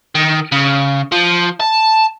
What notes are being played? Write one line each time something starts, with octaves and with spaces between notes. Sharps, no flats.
D#3
C#3
F3
A5